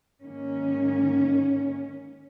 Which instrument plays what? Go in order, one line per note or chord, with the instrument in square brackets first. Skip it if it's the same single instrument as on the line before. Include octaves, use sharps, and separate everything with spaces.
[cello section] G#2 D#3 A#3 C#4